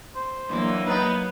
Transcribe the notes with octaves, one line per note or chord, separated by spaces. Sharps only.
C5
G2 E3 F#3 A#3
B3 D#4 B4